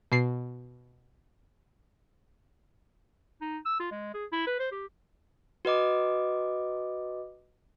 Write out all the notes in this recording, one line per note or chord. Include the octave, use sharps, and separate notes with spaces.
B2 C7
D#4
E6
F4
G#3
G#4
E4
B4
C5
G4
F#4 B4 D#5 D6